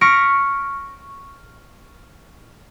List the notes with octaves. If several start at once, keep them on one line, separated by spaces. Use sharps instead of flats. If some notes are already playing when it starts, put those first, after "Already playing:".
C#6 F6 A#6 B6 C#7 D7